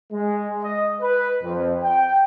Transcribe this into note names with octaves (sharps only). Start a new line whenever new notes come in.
G#3
D#5
B4
F2
G5